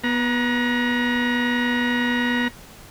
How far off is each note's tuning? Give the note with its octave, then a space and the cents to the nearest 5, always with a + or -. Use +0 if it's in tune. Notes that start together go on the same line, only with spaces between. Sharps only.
B3 -15 A#5 +30